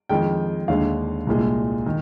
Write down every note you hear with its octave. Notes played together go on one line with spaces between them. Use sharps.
F2 D#3 G#3 G5
D#2 D3 G#3 F5
C2 A#2 G#3
D#3